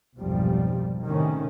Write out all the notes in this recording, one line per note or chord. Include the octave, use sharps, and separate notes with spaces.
F1 B1 G#2 F3 G3
A2 C3 D#3 G3 C#4